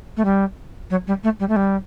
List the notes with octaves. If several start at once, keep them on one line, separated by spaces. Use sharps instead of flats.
A3
G3
F#3
G3
A3
G3
A3
G3